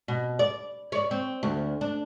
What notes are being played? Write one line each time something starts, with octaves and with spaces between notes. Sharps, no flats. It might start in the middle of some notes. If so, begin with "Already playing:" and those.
B2
D5
C#5 D5
C4
D2
D4